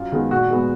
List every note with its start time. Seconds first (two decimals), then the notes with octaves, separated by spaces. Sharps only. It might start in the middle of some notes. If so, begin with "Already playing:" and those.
Already playing: F#2 F4
0.12 D#3 G#3 B3
0.31 A#2 F#4
0.50 G#3 B3